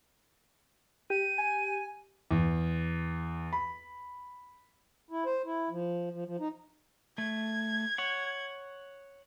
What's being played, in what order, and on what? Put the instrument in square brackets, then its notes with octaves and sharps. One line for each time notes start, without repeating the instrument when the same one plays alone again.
[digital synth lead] G4 [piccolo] D#7
[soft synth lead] G#5
[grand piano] E2
B5
[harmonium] E4
C5
E4
F3
F3
F3
D#4
[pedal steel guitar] A3 [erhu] G#6
[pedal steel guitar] C#5 F#5